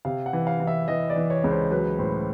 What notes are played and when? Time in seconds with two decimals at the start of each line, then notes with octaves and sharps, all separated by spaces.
0.05 C3 F5
0.26 F#5
0.33 E3
0.47 F5
0.60 E3
0.67 E5
0.88 E3 D#5
1.10 D5
1.16 E3
1.30 C#5
1.44 C#2
1.51 C5
1.71 F#3 B4
1.99 A2 C5